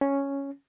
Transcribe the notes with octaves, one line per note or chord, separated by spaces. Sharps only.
C#4